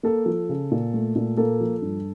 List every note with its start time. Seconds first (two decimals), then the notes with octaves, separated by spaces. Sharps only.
0.03 A#3 A4
0.26 F3
0.49 C#3
0.71 A#2
0.93 A3
1.15 A#2
1.37 A#3 A4
1.60 F3
1.82 G2